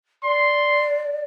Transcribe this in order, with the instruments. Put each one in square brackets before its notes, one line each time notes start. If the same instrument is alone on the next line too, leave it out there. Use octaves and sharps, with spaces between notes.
[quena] D5 [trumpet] C6